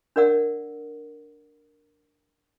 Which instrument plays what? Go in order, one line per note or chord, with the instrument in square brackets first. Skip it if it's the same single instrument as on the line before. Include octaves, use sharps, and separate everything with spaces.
[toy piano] D4 A#4 D5 F#5 E6